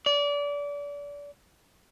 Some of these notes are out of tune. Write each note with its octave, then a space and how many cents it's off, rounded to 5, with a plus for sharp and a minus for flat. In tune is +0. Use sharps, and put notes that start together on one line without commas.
D5 -30